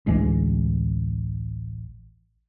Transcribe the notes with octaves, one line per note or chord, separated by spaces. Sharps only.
A1 D2 E3 G#3